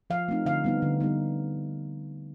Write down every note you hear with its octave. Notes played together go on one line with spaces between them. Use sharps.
F3 F5
A3 C4 D#4
D3 F5
G3 B3 D#4
D3
G3 B3 D#4